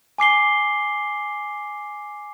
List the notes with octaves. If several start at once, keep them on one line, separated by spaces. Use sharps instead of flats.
G#5 D6 C7 G7